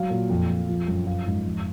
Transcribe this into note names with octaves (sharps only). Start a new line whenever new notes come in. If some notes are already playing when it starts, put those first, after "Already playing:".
Already playing: F#3 F5
A#2
F2
F2
F3
F#2
F3 F5
G#2
F2